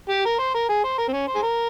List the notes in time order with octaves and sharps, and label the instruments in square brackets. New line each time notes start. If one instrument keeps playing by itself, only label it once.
[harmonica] G4
A#4
C5
A#4
G#4
C5
A#4
C4
C#4
C5
G#4
A#4